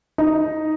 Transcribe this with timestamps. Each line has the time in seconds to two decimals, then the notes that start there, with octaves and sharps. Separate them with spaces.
0.18 D#4